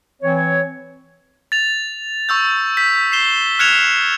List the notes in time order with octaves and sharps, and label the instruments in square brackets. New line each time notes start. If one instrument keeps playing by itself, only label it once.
[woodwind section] E3 C4 C#5
[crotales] A6 F7
C#6 E6 G6
G6 B6
C7 E7 G7
F6 F#6 G#6 C#7 E7 F7